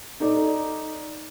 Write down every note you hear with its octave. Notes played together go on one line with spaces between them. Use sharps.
D#4 A4 D5